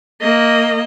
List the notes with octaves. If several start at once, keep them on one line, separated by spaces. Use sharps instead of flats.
A#3 D#5